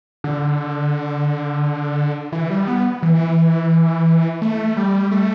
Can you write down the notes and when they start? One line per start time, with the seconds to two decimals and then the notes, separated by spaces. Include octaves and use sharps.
0.24 D3
2.32 E3
2.50 G3
2.68 B3
3.02 E3
4.42 A3
4.77 G3
5.11 A3